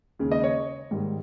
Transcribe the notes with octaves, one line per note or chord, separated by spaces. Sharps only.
D#2 C#3 G#3
D#5
C#5
G#2 D#3 G3